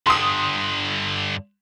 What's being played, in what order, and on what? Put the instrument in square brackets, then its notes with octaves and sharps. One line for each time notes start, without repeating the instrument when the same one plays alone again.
[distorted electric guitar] G2 D3 [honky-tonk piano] C6 D#6